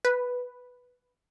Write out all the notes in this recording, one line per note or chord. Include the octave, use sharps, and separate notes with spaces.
B4